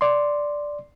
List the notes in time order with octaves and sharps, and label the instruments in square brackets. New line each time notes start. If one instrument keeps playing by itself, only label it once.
[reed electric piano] D5 C6